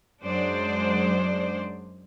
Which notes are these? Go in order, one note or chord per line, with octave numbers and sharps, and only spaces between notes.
F#2 F#3 G#3 D4 C5 D5